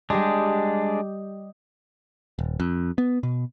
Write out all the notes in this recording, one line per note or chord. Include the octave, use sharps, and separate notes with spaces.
G3 G#3 D4 G4 D#5
D#1
F2
B3
B2